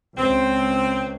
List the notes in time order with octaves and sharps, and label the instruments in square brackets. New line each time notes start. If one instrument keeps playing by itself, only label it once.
[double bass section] C#2 [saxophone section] C4